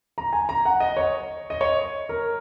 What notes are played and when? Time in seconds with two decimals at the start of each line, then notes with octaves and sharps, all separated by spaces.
0.18 A#5
0.33 G#5
0.49 A#5
0.65 F#5
0.80 D#5
0.97 C#5
1.50 D#5
1.61 C#5
2.09 A#4